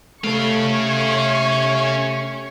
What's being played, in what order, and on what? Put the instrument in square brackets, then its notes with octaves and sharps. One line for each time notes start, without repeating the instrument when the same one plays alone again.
[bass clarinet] C3 [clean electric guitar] A3 A4 [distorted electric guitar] C#4 F5 [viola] C#5 C#6